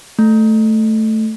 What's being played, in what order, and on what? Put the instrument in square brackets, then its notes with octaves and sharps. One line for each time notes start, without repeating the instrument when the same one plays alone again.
[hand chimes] A3